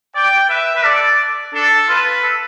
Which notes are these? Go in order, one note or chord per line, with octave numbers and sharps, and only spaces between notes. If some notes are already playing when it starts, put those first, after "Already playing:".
D5 G5
B4 E5
B4
A4 D5
D4 A4
F4 B4
A4